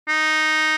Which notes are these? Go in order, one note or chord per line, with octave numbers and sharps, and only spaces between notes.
D#4